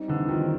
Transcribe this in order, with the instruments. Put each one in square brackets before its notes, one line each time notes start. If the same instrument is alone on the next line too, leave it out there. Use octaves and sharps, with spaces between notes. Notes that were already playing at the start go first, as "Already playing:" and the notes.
Already playing: [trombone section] G3 C4 D#4
[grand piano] D3 E3
D#3 F3